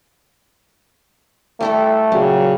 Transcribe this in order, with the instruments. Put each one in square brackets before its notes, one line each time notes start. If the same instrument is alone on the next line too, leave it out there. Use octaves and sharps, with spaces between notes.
[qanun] G3 E4 A4 [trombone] A3
[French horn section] A#2 C#3 F#3 [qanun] G3